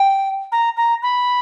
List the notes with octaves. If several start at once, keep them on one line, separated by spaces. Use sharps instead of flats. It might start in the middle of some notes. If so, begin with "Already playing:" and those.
Already playing: G5
A#5
A#5
B5